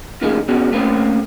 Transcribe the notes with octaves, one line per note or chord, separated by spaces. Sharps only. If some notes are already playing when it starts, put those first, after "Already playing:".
C#3 F3 A3 A#3 D#4 G#4
C#3 B3 C#4 D4 F#4 G#4
A3 A#3 C4 C#4 C5